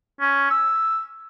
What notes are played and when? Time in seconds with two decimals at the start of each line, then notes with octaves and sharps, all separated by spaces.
0.20 C#4
0.50 E6